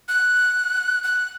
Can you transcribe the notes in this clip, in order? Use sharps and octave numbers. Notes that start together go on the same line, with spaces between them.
F#6
F#6